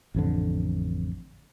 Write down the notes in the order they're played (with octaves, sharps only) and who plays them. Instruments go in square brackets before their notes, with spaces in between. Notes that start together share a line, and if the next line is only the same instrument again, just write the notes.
[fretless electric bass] A1 F2 D3